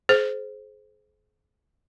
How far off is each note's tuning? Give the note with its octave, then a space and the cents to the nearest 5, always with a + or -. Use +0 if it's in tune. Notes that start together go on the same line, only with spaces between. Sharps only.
G#4 +35 C5 +0